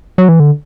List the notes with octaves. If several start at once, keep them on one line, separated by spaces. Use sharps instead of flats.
F#3
E3
D3